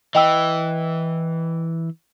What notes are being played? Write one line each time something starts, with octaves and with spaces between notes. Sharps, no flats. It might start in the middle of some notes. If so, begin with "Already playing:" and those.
E3 D#5 G5 E6